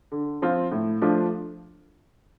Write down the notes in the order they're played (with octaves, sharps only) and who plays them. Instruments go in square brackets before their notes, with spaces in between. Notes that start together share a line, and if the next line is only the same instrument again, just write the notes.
[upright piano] D3
F3 C4 F4
A2
F3 A3 D4 F4